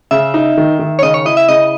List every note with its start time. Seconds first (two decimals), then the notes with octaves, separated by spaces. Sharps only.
0.11 C#3 E5
0.34 D#4
0.57 D#3
0.79 D#3
0.99 C#5
1.02 C#3 D#5
1.14 C#5
1.25 E4 D#5
1.37 E5
1.48 C#3 D#5